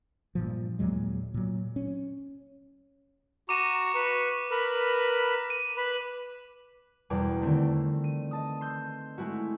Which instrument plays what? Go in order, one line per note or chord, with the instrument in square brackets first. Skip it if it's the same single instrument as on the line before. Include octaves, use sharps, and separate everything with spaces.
[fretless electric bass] G2 A#2 F3
D#2 A#2 F#3 G#3
A#2 F#3
C#4
[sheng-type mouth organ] F#4 A#5 C#6 [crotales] D6 D#7 E7
[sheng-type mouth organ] B4 C#6
A#4 B4 B5
[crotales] D#7
[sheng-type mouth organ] B4 B5
[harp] E1 E2 B2 G3 D6
D3 D#3 A3 C4
D#7
D#5 A5 D#6
C6 E6 G6
G#3 A3 E4 F#4